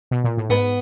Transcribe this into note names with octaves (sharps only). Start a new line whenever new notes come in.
B2
A#2
A2
G#2 B3